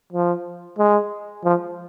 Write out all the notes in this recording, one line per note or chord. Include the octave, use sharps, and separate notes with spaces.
F3
G#3
F3